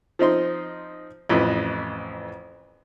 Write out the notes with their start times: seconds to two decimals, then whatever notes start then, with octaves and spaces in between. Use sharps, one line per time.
0.19 F3 C4 D#4 C6
1.29 A1 F2 E3 B4 D#5